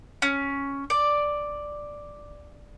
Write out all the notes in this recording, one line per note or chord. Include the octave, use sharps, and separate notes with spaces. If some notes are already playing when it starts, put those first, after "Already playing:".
C#4
D5